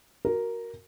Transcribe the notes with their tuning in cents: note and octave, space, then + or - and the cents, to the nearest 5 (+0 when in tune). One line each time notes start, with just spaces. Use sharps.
F#4 +0 A#4 +0